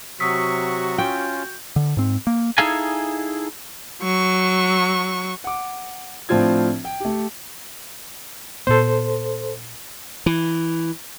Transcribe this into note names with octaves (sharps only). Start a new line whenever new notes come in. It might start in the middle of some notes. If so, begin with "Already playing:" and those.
C3 F#3 F#4 C#6 D#6 E6 B6
C#4 F4 G5
D3
G#2 C4
A#3
D#4 E4 G#4 A4 F5 G#5
F#3 C#6
F#5 D6
A2 F3 C4 D4 F4 G#6
G5
A3 G4
A#2 B3 A4 C5
E3